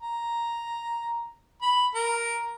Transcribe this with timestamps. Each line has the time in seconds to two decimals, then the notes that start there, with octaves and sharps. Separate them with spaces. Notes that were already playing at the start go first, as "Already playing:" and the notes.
0.02 A#5
1.62 B5
1.95 A#4